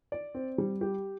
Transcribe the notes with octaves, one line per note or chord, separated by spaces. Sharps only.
D5
C4
G3
G4